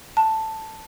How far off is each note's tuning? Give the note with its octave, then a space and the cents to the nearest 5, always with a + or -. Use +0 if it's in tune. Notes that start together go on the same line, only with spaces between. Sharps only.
A5 +5